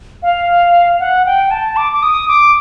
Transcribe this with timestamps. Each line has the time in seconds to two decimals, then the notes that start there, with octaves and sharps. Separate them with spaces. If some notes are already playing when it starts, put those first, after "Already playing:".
0.22 F5
0.99 F#5
1.26 G5
1.51 A5
1.76 D6
1.92 D6
2.03 D#6
2.28 D6